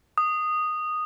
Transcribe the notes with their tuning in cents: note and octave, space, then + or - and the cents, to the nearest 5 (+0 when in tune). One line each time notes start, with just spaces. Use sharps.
D#6 -10